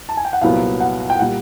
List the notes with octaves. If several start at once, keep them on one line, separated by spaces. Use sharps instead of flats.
A5
G#5
G5
F#5
C2 A#2 F#3 B3 F5
F#5
G5
A#2 G3 F#5